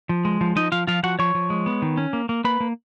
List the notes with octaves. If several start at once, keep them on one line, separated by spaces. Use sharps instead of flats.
F3
G#3
F3
F3 D#4 D#5
F3 F4 F5
F3 F4 F5
F3 F#4 F#5
F3 C#5 C#6
F3
G#3
B3
D#3
C#4
A#3
A#3
A#3 B4 B5
A#3